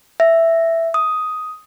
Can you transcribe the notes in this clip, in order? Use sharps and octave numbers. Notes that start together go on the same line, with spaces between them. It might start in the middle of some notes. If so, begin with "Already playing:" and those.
E5
D#6